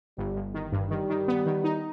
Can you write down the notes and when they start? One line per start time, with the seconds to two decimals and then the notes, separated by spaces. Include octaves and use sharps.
0.17 G1 G3
0.36 G1
0.54 D#3
0.72 G2
0.91 D#3 G3
1.09 D#3
1.28 B3
1.46 D#3
1.64 D#4